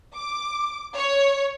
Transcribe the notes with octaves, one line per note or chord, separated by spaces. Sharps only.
D6
C#5